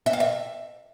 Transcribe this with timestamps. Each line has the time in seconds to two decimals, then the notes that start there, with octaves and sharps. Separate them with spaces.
0.06 E5
0.13 F5
0.20 E5